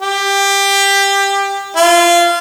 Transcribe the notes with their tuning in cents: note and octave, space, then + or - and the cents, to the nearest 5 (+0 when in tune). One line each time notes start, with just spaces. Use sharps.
G4 +15
F4 -20